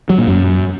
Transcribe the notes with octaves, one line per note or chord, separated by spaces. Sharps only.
F#3
A#2
F#2